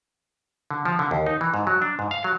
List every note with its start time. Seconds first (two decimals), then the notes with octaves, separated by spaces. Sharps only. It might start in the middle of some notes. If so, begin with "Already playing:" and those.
0.71 D3
0.85 F3
0.99 D3
1.11 D#2
1.26 D#4
1.41 E3
1.54 G#2
1.67 F#3
1.82 D4
1.99 G#2
2.11 F5
2.24 F#3